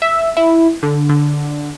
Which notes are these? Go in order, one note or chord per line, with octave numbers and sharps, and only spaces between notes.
E5
E4
D3
D3